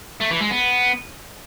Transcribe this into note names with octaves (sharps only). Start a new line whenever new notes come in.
A3
E3
G#3
B3